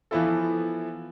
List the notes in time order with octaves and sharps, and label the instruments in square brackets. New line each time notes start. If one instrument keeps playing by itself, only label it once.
[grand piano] E3 F3 B3 E4 F4 A4